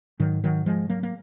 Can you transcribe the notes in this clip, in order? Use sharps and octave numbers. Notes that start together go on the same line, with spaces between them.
G#2 D#3 F#3
D#3 F#3
F3 G#3
F#3 A#3
A#3